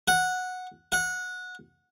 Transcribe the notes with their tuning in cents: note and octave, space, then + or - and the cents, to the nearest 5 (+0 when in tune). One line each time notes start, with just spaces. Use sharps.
F#5 -10
F#5 -20